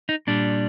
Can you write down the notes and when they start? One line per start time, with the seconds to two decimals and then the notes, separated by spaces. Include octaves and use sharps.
0.09 D#4
0.27 A#2 G3 D4